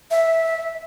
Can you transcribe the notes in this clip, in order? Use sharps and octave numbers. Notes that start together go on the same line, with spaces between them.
E5